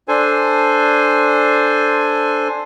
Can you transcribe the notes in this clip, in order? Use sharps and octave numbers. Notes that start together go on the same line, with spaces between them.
D4 A4 C5 G#5